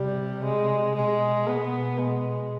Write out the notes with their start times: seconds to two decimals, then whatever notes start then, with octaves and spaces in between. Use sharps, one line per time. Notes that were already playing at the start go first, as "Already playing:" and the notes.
Already playing: C3 G3
0.45 G#3
0.96 B2 G#3
1.47 B2 B3
1.99 G#3